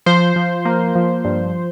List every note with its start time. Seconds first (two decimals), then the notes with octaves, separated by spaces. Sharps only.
0.06 F3 C5
0.36 F3
0.65 A#3
0.95 F3
1.25 G2